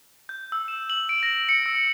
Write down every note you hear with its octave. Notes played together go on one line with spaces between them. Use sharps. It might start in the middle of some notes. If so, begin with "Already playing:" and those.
G6
E6
E7
F#7
D7
A#6
C#7
E6